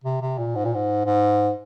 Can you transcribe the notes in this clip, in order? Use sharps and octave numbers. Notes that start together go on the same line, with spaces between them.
C3
C3
A#2
G#2
A#2
G#2
G#2